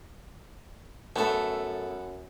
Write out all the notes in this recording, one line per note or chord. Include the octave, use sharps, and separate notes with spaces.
F#2 A3 B3 A4 A5